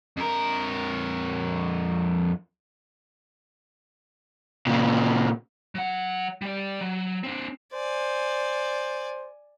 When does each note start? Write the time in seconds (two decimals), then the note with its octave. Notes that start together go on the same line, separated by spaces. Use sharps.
0.17 F2 A#4
4.67 A#2 C#3
5.75 F#3 F#5
6.42 G3 D5
6.81 F#3
7.23 C4 D4
7.73 C5 D5 G#5